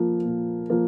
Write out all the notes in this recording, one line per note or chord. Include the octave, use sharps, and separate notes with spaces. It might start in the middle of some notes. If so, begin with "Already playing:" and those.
Already playing: F3 A#3
A#2
F3 A#3